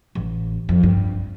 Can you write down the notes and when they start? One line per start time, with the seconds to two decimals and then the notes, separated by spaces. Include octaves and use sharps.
0.15 A1
0.69 F2
0.83 G2